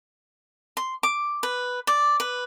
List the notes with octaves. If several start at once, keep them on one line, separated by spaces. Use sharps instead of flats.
C6
D6
B4
D5
B4